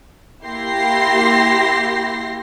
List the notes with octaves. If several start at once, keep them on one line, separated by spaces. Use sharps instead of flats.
A#3 E4 G4 C6 A#6 C7